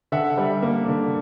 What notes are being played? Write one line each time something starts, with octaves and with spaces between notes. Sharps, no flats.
D3 E5 F#5
G3
A#3
D3